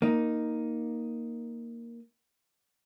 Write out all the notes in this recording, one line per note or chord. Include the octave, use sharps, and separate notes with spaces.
A#3 D#4